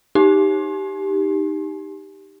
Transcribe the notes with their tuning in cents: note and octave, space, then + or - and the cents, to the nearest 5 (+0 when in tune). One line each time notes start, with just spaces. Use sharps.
D#4 +0 G4 +0